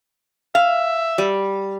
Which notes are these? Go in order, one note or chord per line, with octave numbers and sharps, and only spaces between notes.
E5 F5
G3